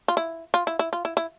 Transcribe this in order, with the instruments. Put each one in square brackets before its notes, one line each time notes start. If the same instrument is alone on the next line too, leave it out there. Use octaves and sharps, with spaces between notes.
[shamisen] F4
E4
F4
E4
E4
F4
E4
E4